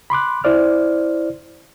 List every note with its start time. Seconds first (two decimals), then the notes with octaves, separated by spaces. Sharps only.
0.10 B5 C6 D6 F#6
0.44 E4 C5 D5 F6